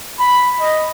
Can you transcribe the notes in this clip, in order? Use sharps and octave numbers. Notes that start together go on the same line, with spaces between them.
B5
D#5